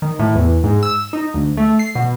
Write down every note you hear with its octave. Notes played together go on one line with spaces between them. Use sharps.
D#3
A2
E2
G#2
E6
D#4
D2
A3
C7
B2